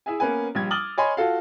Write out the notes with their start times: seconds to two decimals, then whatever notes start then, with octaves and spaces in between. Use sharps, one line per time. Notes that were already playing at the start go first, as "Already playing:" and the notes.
0.06 E4 G#4 E5 G#5
0.20 A#3 B3 C#4 B4 G#5
0.55 A#1 G3 G#6
0.70 D6 D#6 F6 A6 F#7 G7
0.98 C#5 D#5 G#5 B5 C6
1.17 F4 F#4 A4 F5